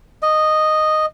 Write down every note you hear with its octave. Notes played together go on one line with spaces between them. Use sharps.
D#5